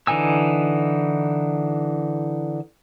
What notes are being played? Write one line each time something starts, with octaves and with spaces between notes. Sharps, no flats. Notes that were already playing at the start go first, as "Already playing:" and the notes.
D3 E3 D#4 G#5 E6